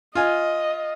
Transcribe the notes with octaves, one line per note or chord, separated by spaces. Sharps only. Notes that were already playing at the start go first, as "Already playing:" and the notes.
F4 D#5 G#5